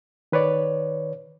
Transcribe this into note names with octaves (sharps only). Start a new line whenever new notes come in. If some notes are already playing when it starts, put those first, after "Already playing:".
D#3 B4 C#5 D5